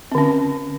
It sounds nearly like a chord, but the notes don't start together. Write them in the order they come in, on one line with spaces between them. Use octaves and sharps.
C4 D3 C#4